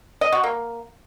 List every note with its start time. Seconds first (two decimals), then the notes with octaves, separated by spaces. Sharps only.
0.21 D#5
0.32 F#4
0.44 A#3